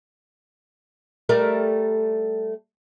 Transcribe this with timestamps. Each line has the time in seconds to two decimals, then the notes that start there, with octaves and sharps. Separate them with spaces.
1.29 G3 A3 A#4